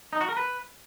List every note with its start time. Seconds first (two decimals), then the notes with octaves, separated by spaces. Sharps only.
0.13 D#4
0.21 F#4
0.29 A#4
0.37 B4